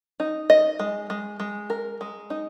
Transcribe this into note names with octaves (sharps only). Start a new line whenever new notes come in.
D#4
D#5
G#3
G#3
G#3
A#4
G#3
D#4